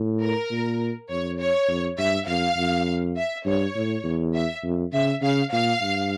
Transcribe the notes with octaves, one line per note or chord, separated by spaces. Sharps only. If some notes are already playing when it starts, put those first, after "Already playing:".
Already playing: A2
A#4
A#2
F2 C#5
C#5
F2
G2 E5
F2 F5
F2
E5
G2 C#5
A2
E2
E5
F2
C#3 E5
C#3 F5
A#2 F5
G2